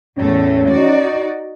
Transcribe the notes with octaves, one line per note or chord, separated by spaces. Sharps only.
E2 A2 A3 C#4
D#4 F#4 D5